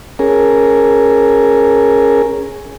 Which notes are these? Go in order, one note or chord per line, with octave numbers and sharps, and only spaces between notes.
C#4 G#4 A#4